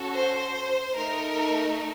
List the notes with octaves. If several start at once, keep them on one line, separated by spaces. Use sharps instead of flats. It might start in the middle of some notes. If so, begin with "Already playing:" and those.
Already playing: C#4 F#4 A4
C5
A3 D#4 A4 A#4